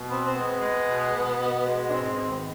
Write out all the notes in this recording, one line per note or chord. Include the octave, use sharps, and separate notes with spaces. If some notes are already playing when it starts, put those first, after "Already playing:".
Already playing: B2
B3 C4
C4
G#3 B3
G#3
B2
B2
B2
G#3
D4
G#2 C4
D#3
B3